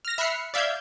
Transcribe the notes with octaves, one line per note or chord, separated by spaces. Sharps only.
F6 A#6
E5 B5 F6 F#6 C7 C#7
D5 E5 F5 G6 G#6